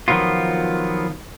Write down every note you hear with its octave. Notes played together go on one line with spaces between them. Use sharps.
D#3 F3 F#3 B3 F4